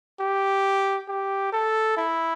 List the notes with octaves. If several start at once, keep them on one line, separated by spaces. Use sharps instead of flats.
G4
G4
A4
E4